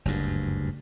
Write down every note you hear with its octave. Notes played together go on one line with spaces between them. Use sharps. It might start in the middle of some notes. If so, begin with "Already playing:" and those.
F#1 D2 G2